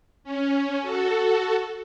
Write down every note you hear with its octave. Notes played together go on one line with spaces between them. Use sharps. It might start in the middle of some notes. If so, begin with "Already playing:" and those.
C#4
F#4 A4